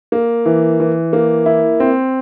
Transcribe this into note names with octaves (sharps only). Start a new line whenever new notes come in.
A#3
E3
E3
A#3
E4
C4